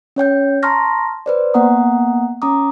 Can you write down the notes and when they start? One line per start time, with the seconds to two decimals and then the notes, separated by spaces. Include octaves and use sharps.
0.16 C#4 C#5 G5 G6
0.63 A5 A#5 C6 C#6 F6 A#6
1.26 B4 C5 D5
1.54 A#3 B3 F#5 A#5 D#6
2.42 C#4 A#5 D6 D#6